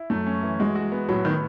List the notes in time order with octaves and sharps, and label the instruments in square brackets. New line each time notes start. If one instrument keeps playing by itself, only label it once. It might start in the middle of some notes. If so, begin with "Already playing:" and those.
Already playing: [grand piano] E4
[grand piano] F#2 [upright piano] A3
[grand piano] C#4
E3
[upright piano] G#3 [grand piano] F#4
[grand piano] F#4
B3
[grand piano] A2 [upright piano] F#3
[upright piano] D#3 [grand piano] B3